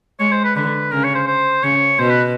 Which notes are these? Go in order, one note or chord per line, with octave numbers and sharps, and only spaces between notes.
G#3 C#5
C5
B4
D3 B4
C#3 A#4
C#5
C5
C5
C#3 C#5
B2 C5
B4